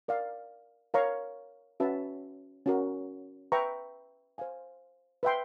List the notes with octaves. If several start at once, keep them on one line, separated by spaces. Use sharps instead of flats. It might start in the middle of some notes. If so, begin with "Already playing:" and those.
A#4 D5 F5
A#4 C#5 F5 A#5 C#6
C#4 F#4 B4 E5 A5
C#4 F#4 A#4
B4 E5 G5 A#5 C#6
C5 F5 G#5
B4 E5 G5 C6